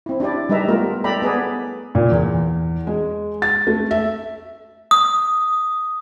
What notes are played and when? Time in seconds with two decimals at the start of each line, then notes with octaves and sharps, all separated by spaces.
0.06 C4 E4
0.20 D4 E4 G4 D5
0.49 G3 G#3 D#4 B4 E5 A#5
0.68 A3 B3 F4 A#4
1.04 A4 D5 E5 G5 A#5 B5
1.22 B3 G#4 B4 D5
1.95 A#2
2.11 E2
2.87 G#3
3.42 A6
3.67 A3
3.91 E5
4.91 D#6